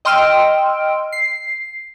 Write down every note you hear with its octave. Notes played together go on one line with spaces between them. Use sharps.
D#5 G5 C6 E6 F6 D7
C7